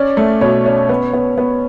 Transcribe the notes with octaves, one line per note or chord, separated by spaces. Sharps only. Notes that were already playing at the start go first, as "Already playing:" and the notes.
Already playing: C#4 D5
A3
B2 C#5
C#4
B3
B3
B3